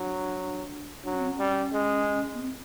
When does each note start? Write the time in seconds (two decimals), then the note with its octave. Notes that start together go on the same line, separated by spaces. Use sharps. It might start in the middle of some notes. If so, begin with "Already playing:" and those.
Already playing: F#3 D4
1.04 F#3 D4
1.13 C#4
1.21 C4
1.29 C#4
1.39 G3
1.73 G#3
2.34 B3
2.40 C4